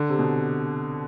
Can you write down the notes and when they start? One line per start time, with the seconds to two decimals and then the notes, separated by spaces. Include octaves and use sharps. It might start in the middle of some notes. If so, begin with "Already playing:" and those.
Already playing: D3
0.09 C3
0.19 B2